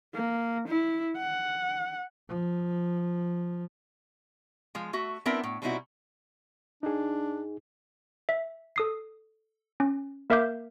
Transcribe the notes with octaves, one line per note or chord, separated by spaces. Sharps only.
A#3
E4
F#5
F3
F3 G#3 F4
A3 F#4 E5
B3 C4 D4 E4 A#4 E5
A2
B2 G3 C4 D#4 E4 F#4
D4 D#4 G#4
E5
A4 D#6 C7
C#4
A#3 A#4 E5 F5 D6 G6